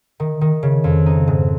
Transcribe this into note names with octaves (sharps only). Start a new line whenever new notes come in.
D#3
D#3
C#3
F2
D#4
G#2